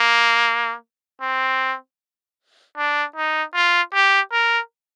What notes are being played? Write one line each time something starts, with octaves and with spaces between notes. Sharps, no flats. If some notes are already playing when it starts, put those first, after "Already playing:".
Already playing: A#3
C4
D4
D#4
F4
G4
A#4